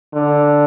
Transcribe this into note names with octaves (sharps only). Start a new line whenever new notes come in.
D3